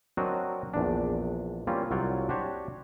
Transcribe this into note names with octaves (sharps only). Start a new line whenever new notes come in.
F#3 C4 D4 F#4 A#4 D#5
A#1 E2 D4
G3 A#3 C4 C#4 F4
C2 F#3 F4 C#5 D5 G5
D4 F#4 G4 C5 C#5